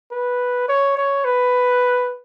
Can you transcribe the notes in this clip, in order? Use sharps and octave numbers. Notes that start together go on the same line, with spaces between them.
B4
C#5
C#5
B4